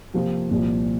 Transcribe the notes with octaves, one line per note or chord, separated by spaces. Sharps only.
C3 F3 A#3 F4
C2 A#2 F3